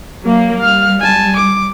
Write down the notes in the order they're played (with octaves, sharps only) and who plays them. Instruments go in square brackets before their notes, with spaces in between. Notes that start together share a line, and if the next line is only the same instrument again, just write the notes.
[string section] F#3 A#3
[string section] G3 [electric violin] F5 F6
[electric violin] G#5 A5
D6